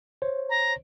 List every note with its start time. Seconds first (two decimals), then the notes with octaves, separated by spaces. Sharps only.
0.22 C5 C#5
0.50 A#5